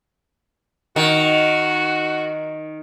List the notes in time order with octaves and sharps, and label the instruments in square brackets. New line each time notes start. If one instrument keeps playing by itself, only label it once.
[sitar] D#3 [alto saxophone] F#4